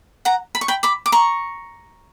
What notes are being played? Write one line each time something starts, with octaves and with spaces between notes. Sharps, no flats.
F#5 A#5
B5
C#6
G5 B5
B5 D6
D6
A#5 C#6